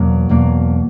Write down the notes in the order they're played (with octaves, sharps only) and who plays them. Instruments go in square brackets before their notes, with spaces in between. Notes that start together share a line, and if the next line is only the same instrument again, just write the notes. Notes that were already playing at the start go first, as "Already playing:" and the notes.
Already playing: [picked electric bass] E2 B2 F#3 A#3
E2 B2 F#3 A#3